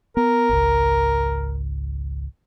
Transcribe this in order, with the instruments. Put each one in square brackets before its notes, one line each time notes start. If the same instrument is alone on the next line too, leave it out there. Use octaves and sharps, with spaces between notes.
[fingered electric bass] B3 [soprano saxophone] A#4
[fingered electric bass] G#1 C#2